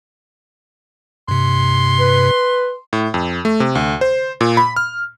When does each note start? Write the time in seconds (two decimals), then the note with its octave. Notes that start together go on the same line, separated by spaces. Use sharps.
1.28 G2 C3 C6
1.99 B4
2.93 A2
3.14 F2
3.45 A3
3.60 C3
3.75 D2
4.01 C5
4.41 A#2
4.57 B5
4.76 F6